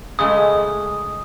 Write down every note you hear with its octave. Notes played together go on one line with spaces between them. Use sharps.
C#3 G#3 A3 D#6